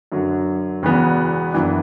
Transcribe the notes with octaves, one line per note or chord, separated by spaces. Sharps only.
F#2 D3 F#3
E1 E2 C#3 E3 B3
F#1 F#2 E3 B3 D4